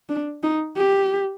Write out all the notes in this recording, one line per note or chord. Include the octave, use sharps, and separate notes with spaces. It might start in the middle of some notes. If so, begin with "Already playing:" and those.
D4
D#4
G4